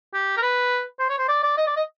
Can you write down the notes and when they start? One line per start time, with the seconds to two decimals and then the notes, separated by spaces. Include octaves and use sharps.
0.14 G4
0.37 A#4
0.42 B4
0.99 C5
1.09 C#5
1.19 C5
1.28 D5
1.43 D5
1.57 D#5
1.67 D5
1.76 D#5